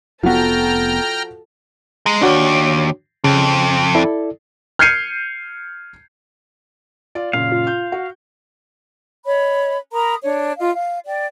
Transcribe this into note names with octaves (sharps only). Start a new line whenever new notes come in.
F1 F3 B3 F#4 A4 G5 A#5 F6
G#3 A#5
D#2 D4 F#4 C#5
F2 C#3
E4 A4 D5
F6 G6 G#6 C7 C#7 D#7
F4 D5
F#2 A#2 C#3 F5
F4
G6
F#4
C#5 D#5 B5
A#4 A#5 B5 D#6
D4 C#5
F4 D#5 F5
F5
D5 G5